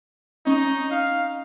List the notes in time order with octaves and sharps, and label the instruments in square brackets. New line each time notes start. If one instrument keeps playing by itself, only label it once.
[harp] C#4 [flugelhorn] D#4
[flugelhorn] F5